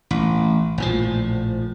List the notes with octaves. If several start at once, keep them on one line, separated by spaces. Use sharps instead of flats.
A1
A#1 A2 F3